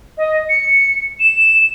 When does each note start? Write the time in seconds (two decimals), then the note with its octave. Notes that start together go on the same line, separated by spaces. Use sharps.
0.17 D#5
0.49 C#7
1.20 E7